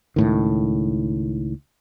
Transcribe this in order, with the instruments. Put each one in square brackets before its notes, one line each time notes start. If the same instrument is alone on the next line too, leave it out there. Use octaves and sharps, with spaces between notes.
[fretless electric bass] C#2 A2 D#3